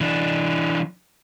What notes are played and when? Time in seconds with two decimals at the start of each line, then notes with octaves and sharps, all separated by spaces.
0.01 E3 D4